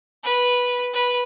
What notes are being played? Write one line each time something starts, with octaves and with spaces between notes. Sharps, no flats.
B4
B4